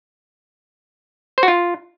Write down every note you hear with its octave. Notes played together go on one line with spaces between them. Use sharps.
C5
F#4
F4